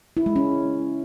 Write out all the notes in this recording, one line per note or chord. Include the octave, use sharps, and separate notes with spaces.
E4
G#3
C#4